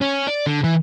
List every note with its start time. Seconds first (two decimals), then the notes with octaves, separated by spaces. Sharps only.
0.01 C#4
0.27 D5
0.46 D3
0.64 E3